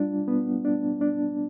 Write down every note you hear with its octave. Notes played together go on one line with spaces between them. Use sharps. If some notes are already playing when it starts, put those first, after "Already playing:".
Already playing: G3 D4 F4
B3
D4
D4